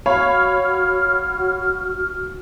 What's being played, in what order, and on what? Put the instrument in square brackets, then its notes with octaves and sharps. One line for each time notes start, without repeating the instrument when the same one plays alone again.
[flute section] F#4 F6 [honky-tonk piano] C#5 F5 B5